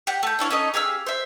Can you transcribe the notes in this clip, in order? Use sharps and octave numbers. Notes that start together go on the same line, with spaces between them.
G4 F#5
A3 G6
D4 E4 C#5 F5
C#4 D#4 A4 D#5
G4 G#4 F5 E6
C5 E5